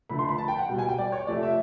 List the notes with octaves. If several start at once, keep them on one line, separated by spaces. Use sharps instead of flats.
D3 F3 A3 B5
C6
B5
A5
G5
F#5
B2 G3 G5
G#5
G5
D5
C#5
C3 F3 A3 D5
E5